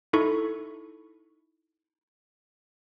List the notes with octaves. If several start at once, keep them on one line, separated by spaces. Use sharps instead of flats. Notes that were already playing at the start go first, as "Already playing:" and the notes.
D#4 E4 A4 C#6